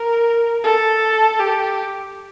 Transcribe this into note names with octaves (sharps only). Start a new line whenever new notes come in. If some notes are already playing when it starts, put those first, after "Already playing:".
Already playing: A#4
A4
G4